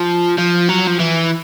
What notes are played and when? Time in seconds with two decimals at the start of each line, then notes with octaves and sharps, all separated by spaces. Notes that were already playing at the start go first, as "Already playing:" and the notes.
Already playing: F3
0.39 F3
0.69 F#3
0.87 F3
0.99 E3